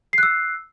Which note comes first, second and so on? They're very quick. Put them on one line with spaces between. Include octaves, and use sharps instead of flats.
C7 F#6 E6